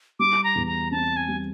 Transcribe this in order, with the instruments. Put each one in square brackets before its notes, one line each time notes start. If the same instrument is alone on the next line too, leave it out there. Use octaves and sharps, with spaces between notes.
[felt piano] G3 [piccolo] D6
[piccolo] A#5
[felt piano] E2
[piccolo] A#5
[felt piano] C4 [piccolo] A5
[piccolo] G#5
[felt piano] G3